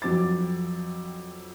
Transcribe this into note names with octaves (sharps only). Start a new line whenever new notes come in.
F2 F#3 C4 D6 A6